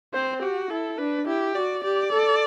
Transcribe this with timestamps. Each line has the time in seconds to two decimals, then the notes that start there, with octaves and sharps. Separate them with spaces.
0.14 C4 C5
0.42 F#4 G4
0.70 E4 A4
0.98 D4 B4
1.27 E4 G4
1.55 F#4 D5
1.84 G4 D5
2.12 A4